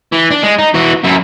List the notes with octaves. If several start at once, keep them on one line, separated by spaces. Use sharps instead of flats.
E3
D4
G#3
D#4
E3 F#4
F#2 E4